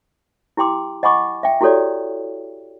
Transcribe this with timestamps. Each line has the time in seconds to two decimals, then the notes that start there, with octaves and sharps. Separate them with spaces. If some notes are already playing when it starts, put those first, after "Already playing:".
0.57 E4 G4 G5 C6 D6
1.03 D#5 F#5 G#5 B5 C#6 D6
1.43 E5 G5
1.61 E4 F#4 G4 A4 C#5 D5